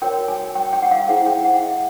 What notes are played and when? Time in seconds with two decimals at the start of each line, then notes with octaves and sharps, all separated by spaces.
0.02 F#4 A#4 C#5 G5
0.28 G#5
0.55 G5
0.73 G5
0.82 F#5
0.91 F5
1.08 E4 G#4 C5 F#5
1.26 G5
1.44 F#5
1.63 E5